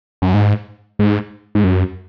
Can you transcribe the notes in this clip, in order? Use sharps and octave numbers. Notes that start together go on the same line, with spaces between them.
F#2
G#2
G#2
G#2
F#2